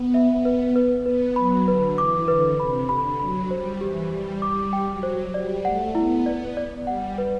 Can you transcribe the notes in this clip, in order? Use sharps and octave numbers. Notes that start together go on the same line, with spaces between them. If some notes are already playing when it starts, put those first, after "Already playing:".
Already playing: B3
E5
B3
B4
B4
B3 B4
F#3 B5
D3 B4
E3 D6
D3 B4
C3 B5
D3 B5
F#3 B5
G3 C5
E3 G4
G3 G4
G3 D6
G5
F#3
C5
G3 D5
A3 F#5
B3 E4
B3 D5
D5
G3 F#5
B4